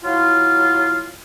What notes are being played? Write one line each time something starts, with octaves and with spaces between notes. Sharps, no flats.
F#3 E4 F4